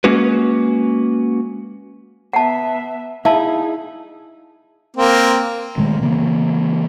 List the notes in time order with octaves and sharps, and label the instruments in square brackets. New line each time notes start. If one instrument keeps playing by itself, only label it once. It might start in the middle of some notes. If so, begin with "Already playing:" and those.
[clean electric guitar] G#3 A#3 C#4 F#4 B4
[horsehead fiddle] B3 E5 [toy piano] F#5 A5
[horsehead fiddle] D#4 G#4 [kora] E4 [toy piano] F5 A5
[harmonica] A#3 C4
[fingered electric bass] A#2 D#3 G#3 A3
C#3 E3 A#3 B3